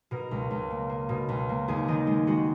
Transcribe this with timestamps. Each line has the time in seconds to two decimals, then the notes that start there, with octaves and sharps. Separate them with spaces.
0.11 B2 A#4
0.31 C#2
0.51 C#2
0.70 A#3
0.89 A#3
1.09 B2
1.29 C#2
1.49 A#3
1.68 D#2 G#4
1.88 D#3 D#5
2.07 G#3
2.27 G#3 F#4